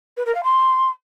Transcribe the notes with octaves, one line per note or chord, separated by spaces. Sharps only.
B4
A#4
F5
C6